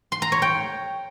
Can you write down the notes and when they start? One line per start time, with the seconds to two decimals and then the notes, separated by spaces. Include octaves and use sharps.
0.12 C6
0.22 A#5
0.32 C#5
0.42 G5